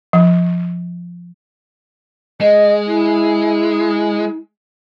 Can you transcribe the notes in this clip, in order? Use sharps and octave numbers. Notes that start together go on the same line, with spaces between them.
F3
G#3 D#5
E4